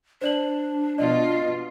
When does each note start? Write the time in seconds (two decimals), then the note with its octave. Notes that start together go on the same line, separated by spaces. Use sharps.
0.21 D4 C5 D5 F#7
0.98 B2 F4 D5 D#5